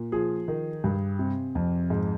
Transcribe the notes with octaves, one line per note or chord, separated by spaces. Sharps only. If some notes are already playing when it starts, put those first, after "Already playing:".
Already playing: A#2
F3 G#4
D#3
G2
C3
F2
G#2